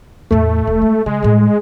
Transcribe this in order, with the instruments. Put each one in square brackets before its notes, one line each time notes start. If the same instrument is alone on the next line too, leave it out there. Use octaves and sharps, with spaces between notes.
[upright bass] E2 A2 [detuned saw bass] A3
[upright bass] D#1
G#3
[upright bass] C#3 [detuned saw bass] G#3
[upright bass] A2 G3